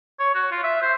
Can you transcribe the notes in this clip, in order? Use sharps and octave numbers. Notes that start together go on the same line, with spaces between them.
C#5
F#4
F4
E5
C5